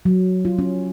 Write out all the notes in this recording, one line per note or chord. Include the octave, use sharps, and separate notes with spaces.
F#3
F4
C#4